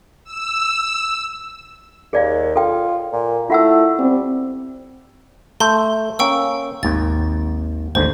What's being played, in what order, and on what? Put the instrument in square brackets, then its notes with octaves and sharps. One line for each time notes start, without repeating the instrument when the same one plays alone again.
[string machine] E6
[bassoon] D#2 [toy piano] G#4 D5 F5
[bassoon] F4 [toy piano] A4 G5
[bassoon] A#2
[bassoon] A3 [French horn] E4 [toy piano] F4 F#5 E6
[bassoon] G3 [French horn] C4
[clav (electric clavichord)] A3 A4 [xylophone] C6 G6
[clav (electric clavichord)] A#3 C#4 [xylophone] G5 C#6 E6
[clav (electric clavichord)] G#1 D#2 [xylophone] A6
[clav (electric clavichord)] G#1 D#2 D3 [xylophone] C5